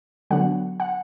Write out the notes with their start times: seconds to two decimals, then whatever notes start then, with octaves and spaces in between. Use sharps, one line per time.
0.31 D3 F#3 B3 D4 F#5
0.80 F#5